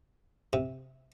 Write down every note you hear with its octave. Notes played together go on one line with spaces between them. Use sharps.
C3